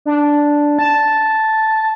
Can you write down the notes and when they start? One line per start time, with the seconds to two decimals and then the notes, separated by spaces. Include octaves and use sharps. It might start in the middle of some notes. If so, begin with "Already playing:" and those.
0.06 D4
0.79 A5